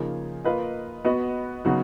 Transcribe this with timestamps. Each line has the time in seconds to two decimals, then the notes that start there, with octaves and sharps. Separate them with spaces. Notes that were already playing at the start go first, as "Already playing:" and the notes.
Already playing: C#3 F3 A#3 D#4 G#4
0.45 A#3 F4 B4 D#5
1.05 B3 F#4 B4 D#5
1.65 C#3 F#3 B3 D#4 F#4